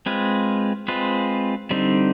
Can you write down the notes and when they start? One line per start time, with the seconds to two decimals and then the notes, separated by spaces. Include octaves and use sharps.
0.06 G#3 C4 F4 B4
0.88 G#3 C4 F4 B4
1.71 D3 G3 C4 D#4